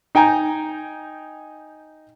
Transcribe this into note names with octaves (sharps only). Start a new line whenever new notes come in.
D#4 G5 G#5 A#5